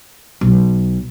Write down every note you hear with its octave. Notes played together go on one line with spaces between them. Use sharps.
B1